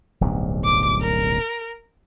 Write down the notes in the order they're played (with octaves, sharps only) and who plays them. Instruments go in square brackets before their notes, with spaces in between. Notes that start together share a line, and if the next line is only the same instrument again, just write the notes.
[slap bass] D1 B1 G2
[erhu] D6
A#4